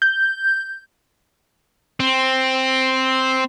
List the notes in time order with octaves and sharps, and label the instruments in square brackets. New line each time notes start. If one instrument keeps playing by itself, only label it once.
[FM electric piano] G6
[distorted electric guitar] C4